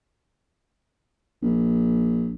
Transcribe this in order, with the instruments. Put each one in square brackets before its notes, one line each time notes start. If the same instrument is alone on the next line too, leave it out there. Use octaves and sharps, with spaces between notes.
[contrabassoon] A#1